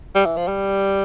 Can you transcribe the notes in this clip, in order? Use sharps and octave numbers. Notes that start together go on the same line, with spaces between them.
G3
E3
F3
G3